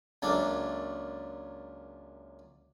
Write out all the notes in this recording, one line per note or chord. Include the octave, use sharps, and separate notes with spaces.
C#2 F#2 A#3 D4 A4